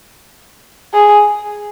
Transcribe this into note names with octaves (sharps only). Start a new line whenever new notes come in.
G#4